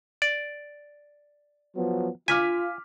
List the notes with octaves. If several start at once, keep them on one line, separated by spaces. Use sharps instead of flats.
D5
F3 F#3 B3
F4 G#5 D6 F6 B6